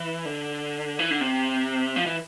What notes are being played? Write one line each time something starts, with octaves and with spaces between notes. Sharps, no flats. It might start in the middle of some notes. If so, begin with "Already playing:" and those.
Already playing: E3
D3
E3
D3
C3
F3
E3